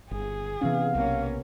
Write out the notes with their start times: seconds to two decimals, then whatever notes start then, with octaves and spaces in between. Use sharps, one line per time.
0.11 G1 G#4
0.61 C3 E3 B3 C#4 F5
0.95 B1 A#3 C#4